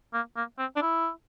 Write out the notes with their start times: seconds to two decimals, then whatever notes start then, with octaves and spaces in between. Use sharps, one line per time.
0.14 A#3
0.36 A#3
0.58 C4
0.76 D4
0.81 E4